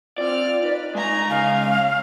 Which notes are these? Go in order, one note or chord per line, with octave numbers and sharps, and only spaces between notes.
C4 F4 D5 F6
D#4 B4
G#3 E5 G#5 A#5
C#3 D#5 F5 G#5
C#4